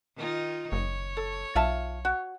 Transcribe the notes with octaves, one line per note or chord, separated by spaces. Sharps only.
D#3 D#4 F4
F#1 C#5
A4
B1 F4 E5 A5
F#4